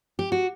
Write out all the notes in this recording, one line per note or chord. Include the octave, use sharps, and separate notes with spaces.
G4
F#4